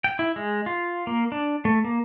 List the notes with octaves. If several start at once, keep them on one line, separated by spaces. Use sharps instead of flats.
G5
E4
G#3
F4
A#3
D4
A3
A#3